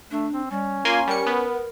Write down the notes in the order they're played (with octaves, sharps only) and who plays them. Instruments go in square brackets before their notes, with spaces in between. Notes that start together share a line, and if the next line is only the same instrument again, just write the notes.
[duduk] A3 [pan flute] D4
[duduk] C4
[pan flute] G3 [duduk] C#4
[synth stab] A#3 G#5 C6 [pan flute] F4
[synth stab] G3 C#7 [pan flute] A#4
[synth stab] B3